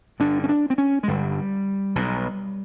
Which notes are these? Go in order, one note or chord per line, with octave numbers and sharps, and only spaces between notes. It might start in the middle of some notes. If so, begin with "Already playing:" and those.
G1 G2 D3 D4
C#4
D4
C4
C#4
G#3
G1 G2 D3 G3
B1 B2